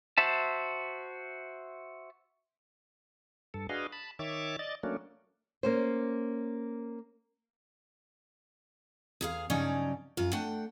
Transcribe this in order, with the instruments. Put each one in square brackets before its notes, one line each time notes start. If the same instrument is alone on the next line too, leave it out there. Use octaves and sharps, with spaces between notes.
[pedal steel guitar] F#4 C5 E5 A5
[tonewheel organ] G2 A4
D4 F#4 G#4 B4 D#5 F5
A5 B5
D#3 C#5 E5 D6 A6
D5 D#5 A6
F#3 A3 A#3 C#4 D4
[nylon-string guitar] A#3 C#4 C5
[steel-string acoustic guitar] E2 G#4 F5
G2 C#3 F#3 C#4 D#4 D5
F#2 F4
A3 D4 F#5 G5